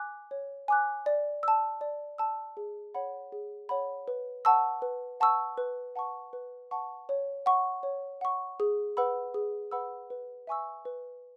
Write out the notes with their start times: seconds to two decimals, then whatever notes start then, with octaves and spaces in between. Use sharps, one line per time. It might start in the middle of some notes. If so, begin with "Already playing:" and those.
Already playing: G#5 D6 F#6
0.31 C#5
0.68 G#5 D6 F#6
1.06 D5
1.43 A5 E6
1.81 D5
2.18 A5 E6
2.57 G#4
2.94 C#5 F#5 B5
3.32 G#4
3.69 C#5 F#5 B5
4.08 B4
4.45 F#5 A5 C#6 E6
4.82 B4
5.20 F#5 A5 C#6 E6
5.58 B4
5.96 F#5 A5 C#6
6.33 B4
6.71 F#5 A5 C#6
7.09 C#5
7.46 F#5 C#6
7.83 C#5
8.21 F#5 C#6
8.60 G#4
8.97 B4 F#5 B5 E6
9.34 G#4
9.71 B4 F#5 B5 E6
10.10 B4
10.47 E5 G#5 C#6 E6
10.85 B4